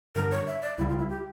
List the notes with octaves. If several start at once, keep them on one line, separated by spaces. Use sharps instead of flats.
G2 D3 G3 D4 A#4
C#5
E5
D5
C#2 C#3 G3 E4
F4
E4
G4